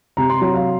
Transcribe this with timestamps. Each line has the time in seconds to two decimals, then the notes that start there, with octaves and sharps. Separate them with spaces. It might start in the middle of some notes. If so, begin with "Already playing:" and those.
0.17 C3 A#5
0.30 C6
0.41 F#3 A#5
0.54 F5